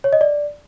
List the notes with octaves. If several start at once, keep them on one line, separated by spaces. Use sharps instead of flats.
C#5
D#5
D5